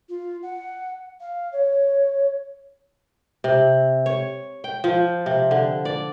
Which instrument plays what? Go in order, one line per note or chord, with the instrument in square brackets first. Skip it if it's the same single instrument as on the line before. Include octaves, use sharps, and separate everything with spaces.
[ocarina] F4
F#5
F5
C#5
[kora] C3
C#5
G5
F3
C3
D3
D5